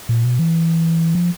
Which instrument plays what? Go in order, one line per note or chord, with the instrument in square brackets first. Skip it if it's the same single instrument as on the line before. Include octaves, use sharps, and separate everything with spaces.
[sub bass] A#2
B2
E3
F3